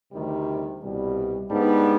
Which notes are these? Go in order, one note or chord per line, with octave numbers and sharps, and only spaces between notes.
D2 C3 D#3 G3
C2 B2 G3
G#2 G3 B3 D4